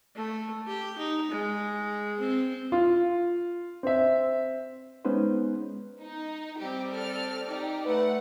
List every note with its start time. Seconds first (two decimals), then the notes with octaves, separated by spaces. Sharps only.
0.15 A3
0.67 G4
0.98 D#4
1.31 G#3
2.19 C4
2.72 F4
3.83 C4 E5
5.05 G#3 B3 C#4 D#4 B4 C5
6.02 D#4
6.59 G3 C4 G4
6.93 A4 D5 F6
7.48 D#4 G4 D5
7.86 A3 B4 F#5